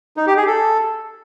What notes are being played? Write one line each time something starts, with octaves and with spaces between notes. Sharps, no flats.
D#4
G4
G#4
A4